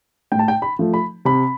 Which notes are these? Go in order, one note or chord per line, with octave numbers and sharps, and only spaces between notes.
A2 G5
A5
G5
B5
F3 A3
B5
C3 B5